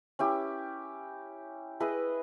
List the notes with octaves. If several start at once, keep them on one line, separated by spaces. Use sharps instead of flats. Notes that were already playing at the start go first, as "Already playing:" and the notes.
C#4 E4 G4
E4 G#4 B4 D#5